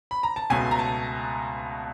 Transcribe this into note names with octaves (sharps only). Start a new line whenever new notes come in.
B5
A#5
A5
C#2 B2 F#3 A3 C#4 G#5
A#5
A5